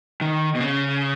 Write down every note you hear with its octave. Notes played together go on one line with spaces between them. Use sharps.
D#3
B2
C#3